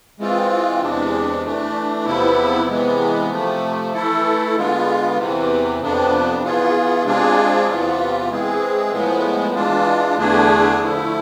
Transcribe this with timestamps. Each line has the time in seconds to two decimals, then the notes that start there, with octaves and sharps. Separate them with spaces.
0.18 E3 G#3 C4 F4
0.81 E2 C3 G#3 D4
1.43 E3 A3 D4
2.05 E2 C3 F3 B3 E4
2.69 C3 E3 G#3 B3
3.31 C3 F3 A3
3.94 E3 A3 E4 A4
4.55 D3 G#3 B3 F4
5.17 E2 C3 E3
5.80 F2 C3 F3 B3 D4
6.42 E3 B3 F4 G#4
7.05 C3 G#3 D4 F4 G#4
7.67 E2 C3 E3 B3 F4
8.30 E3 G#3 C4 G#4
8.92 A2 F3 G#3 B3
9.55 E3 G#3 D4 F4
10.17 E2 D3 A3 D4 G#4
10.79 D3 F3 A3 E4